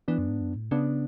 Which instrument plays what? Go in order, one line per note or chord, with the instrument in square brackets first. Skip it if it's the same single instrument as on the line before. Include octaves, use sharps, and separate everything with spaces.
[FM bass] E3 [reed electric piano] B3 D4
[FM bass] F#2
G#2
F#2
A2
[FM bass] C#3 [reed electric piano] B3 D4